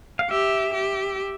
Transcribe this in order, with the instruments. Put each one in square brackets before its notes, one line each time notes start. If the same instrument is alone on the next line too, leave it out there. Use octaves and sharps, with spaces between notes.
[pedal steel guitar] F5
[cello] G4 [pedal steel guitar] E5
[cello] G4